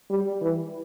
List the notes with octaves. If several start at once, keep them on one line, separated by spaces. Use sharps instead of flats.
G3
E3